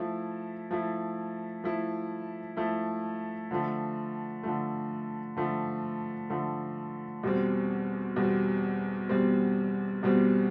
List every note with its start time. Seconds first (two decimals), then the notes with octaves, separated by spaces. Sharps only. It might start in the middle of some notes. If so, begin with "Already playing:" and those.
Already playing: F3 A3 E4
0.71 F3 A3 E4
1.64 F3 A3 E4
2.57 F3 A3 E4
3.51 D3 F3 A3
4.43 D3 F3 A3
5.36 D3 F3 A3
6.30 D3 F3 A3
7.23 E2 B2 G3 C4
8.16 E2 B2 G3 C4
9.09 E2 B2 G3 C4
10.03 E2 B2 G3 C4